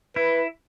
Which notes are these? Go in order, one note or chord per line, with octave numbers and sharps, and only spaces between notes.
E4 B4